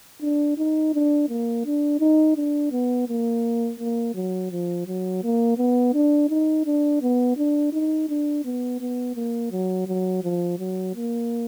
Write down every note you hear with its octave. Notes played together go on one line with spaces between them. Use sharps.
D4
D#4
D4
A#3
D4
D#4
D4
B3
A#3
A#3
F#3
F3
F#3
A#3
B3
D4
D#4
D4
B3
D4
D#4
D4
B3
B3
A#3
F#3
F#3
F3
F#3
A#3